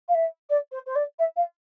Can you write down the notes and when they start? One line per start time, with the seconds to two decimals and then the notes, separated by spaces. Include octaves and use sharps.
0.08 F5
0.14 E5
0.50 D5
0.72 C5
0.86 C5
0.95 D5
1.19 E5
1.36 F5